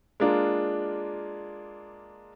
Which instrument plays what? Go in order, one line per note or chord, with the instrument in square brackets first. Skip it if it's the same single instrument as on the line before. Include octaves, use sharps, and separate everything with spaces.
[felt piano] G#3 A#3 D4 F4